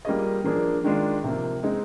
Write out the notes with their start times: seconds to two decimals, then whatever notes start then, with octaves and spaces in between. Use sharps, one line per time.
0.05 G3 A#3 F4 G#4 D#5
0.44 F3 A#3 D4 G#4
0.84 D#3 G#3 D4 F4
1.24 C3 F3 A#3
1.63 G#3 C4 D#4 G#4